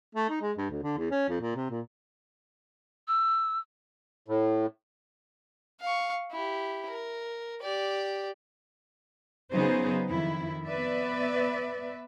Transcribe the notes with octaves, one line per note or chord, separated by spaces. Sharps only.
A3
D#4
G#3
G2
D2
D3
E2
C#4
F2
A#2
C3
A#2
E6
A2
F5 C#6
E4 G4
A#4
G4 D5
C#3 F#3 B3 D#4 G#4 C5
F2 D#3 E4
B3 B4 D5 E5